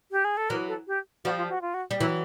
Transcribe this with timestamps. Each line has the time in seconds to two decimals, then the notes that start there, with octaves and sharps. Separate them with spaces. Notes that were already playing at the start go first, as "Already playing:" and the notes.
0.11 G4
0.25 G#4
0.37 A4
0.49 E3 F#3 A#4
0.68 A4
0.87 G4
1.24 F3 G3 F#4
1.38 F4
1.50 F#4
1.62 F4
1.74 F#4
1.91 G3
2.00 E3 F#3 E4